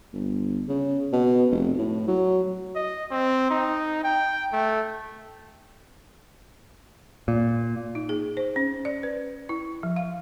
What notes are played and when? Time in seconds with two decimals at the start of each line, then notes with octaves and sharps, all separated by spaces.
0.13 G1
0.68 C#3
1.13 B2
1.51 F1
1.78 A2
2.07 F#3
2.75 D#5
3.11 C4
3.50 D#4
4.04 G5
4.52 A3
7.28 A#2
7.95 D#4
8.09 G#4
8.37 C5
8.56 C#4
8.85 D5
9.03 B4
9.49 E4
9.83 F3
9.96 F5